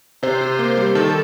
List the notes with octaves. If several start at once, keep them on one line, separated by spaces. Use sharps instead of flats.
C3 C5
C3
A#3
G3
D#3 A4